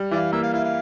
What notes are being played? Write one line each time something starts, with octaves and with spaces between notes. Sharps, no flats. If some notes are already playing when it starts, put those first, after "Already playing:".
Already playing: G3
E3 D5 F5
A#3 E5
F5
E4 F5
F5